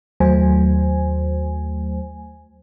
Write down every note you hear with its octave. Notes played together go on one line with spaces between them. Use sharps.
D#2 F#3 A3 C5 G#5